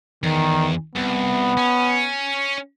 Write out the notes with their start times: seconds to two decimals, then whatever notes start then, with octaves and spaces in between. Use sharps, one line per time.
0.23 E2 D#3
0.95 C2 B3
1.57 C#4